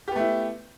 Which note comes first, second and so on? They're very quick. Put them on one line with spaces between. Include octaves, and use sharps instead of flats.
G4 B3 A3 E4